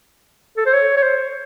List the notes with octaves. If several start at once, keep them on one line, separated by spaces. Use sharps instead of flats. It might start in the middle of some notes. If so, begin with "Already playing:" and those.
A4
C5
C#5
C#5
C5